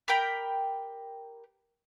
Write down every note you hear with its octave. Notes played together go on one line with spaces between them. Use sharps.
G4 A#4 G5 B5